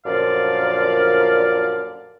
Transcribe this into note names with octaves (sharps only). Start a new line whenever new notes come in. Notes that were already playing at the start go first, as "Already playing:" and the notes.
F#2 A#2 D3 F3 D5 F5